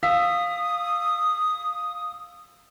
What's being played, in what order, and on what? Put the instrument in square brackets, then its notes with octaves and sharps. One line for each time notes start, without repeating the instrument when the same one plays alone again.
[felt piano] F5 E6 B6 [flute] D#6